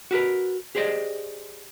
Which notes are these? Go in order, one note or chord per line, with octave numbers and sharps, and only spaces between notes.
F#4 G4 A#4 B4
G4 G#4 C5 D5 D#5